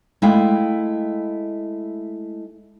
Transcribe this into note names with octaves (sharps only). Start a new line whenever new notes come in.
G#3 A3 E4 F5 G5